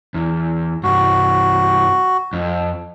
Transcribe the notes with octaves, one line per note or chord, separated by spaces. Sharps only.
E2
C2 G2 F#4
F2